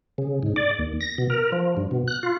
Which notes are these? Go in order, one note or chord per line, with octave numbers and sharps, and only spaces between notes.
C#3
G#2
D5
D#2
A#6
B2
A#4
F3
G2
B2
F#6
F4